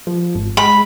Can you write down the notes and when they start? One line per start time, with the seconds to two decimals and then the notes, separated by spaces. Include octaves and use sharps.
0.07 F3
0.35 G#1
0.57 G#3 B5